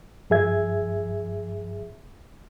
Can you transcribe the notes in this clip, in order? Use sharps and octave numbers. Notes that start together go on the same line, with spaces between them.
G2 F3 G#4 E5 G#6